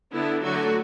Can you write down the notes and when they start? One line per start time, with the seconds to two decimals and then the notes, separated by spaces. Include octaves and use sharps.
0.12 D3 B3 D4 E4
0.43 D3 F#3 A3 F#4